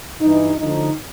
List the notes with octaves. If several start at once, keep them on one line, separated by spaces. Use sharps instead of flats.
G2 E3 D#4
D2 D3 F3 D#4